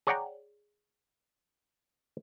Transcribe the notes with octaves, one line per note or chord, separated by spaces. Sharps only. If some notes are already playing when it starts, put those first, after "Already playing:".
G#4 C#5 D5 F#5 G5 A#5